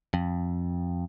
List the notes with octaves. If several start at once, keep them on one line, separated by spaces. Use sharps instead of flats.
F2